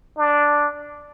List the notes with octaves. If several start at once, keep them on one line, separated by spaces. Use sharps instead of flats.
D4